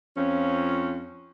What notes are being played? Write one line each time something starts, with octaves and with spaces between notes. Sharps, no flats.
F2 F3 C#4